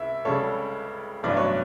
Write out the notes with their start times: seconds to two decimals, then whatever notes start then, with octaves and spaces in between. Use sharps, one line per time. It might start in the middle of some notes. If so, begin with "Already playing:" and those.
Already playing: C#2 E5
0.25 C#2 C#3 G3 A4 C#5
1.23 A1 G2 F#3 B3 D5
1.37 C#5